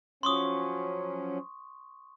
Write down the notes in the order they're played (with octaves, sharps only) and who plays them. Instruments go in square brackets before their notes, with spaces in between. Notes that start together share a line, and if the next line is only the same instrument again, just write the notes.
[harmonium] F3 F#3 C#4 [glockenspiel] C6 C#6 D#6